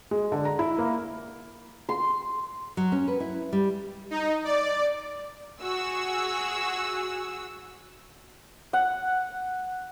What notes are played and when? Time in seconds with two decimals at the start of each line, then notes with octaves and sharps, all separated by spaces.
0.11 G#3
0.32 D3
0.45 A#5
0.59 E4
0.79 A#3
1.89 C6
2.77 F#3
2.92 C#4
3.08 B4
3.20 E4
3.53 G3
4.11 D#4
4.44 D5
5.61 F#4 G#4 E6
8.73 F#5